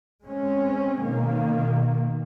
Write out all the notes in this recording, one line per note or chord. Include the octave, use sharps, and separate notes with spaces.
G#3 C4 C#4
B2 D#3 A#3